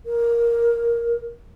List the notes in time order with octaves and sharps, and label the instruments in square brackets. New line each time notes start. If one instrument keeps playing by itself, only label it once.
[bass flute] A#4